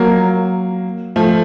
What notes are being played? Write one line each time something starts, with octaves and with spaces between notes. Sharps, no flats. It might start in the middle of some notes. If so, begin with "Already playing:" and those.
Already playing: F#3 A#3
F3 A3